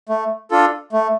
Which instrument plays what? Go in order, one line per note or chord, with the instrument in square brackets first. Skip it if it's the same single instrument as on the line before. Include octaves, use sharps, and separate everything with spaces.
[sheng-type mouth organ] A3
D4 F4 A4
A3